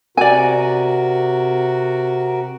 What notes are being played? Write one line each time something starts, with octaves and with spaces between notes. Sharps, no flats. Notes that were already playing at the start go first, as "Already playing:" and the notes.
C3 F#4 A#4 D5 G#5